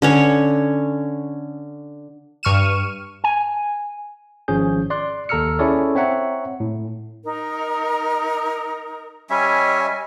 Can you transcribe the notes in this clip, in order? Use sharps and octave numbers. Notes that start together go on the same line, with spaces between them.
D3 C#4 C#5
G2 C#6 F6 D#7 E7
G#5
G#1 F3 C#4 G#4 G6
D5 C6 F#6
D#2 A4 A#5 E6 F6 C#7
C#4 E4 G#4 A4 C#5 D5
C4 C#5 E5 F#5 A#5
A2
D#4 A#4
G3 C#4 D#5 E5 G#5